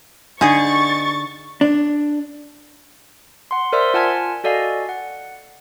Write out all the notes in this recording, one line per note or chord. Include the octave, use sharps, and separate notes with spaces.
D3 D#4 G#4 G#5 C#6 A6
D4
F#5 C6
A#4 C5 D5 E5 C6 E6
F4 F#5 G#5 A5 F6 G#6
F#4 A4 D5 D#5 F5 G#5
F#5